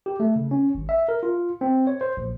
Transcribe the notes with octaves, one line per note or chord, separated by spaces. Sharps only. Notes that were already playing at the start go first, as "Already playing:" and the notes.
G4
A3
C#3
C#4
G#1
E5
A#4
F4
C4
C#5
C5
A#1